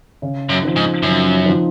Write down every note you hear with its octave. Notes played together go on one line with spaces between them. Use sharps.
C#3
F#2
F3 C4 D#4
G#2
F#2 C#3
F3 C4 D#4